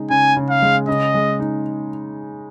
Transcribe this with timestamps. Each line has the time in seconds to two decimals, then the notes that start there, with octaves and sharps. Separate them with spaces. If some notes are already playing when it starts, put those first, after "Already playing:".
Already playing: C#3 G#3 D#4
0.10 C#3 G#5
0.36 C#3
0.50 F5
0.62 G#3
0.88 C#3 D#5
1.14 G#3
1.40 D#4